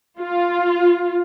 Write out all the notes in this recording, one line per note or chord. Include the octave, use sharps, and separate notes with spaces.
F4